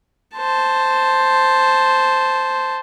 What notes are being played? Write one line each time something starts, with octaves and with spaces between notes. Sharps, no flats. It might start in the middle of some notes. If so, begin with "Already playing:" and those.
C5 A5